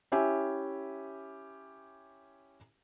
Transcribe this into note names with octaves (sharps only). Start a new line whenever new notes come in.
C#4 E4 G4 E5 G#5